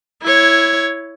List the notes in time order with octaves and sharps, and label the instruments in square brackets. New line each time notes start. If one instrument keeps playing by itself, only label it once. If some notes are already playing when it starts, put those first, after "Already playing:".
[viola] E4 C#5